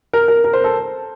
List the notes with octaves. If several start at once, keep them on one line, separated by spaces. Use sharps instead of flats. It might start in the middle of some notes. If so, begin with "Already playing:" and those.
A#4
A#4
A#4
C5
A4